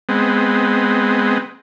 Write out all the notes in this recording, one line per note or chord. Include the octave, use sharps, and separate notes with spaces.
G#3 B3 C4